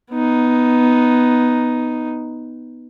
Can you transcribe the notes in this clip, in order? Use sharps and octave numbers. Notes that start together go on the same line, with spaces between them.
B3 D#4